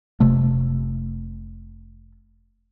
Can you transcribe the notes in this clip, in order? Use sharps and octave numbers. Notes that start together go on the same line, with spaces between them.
F1 C3 A3